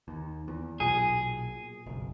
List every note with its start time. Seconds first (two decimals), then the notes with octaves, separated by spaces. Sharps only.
0.08 D#2
0.48 E2
0.80 B1 A#2 G#4
1.86 F#1 B1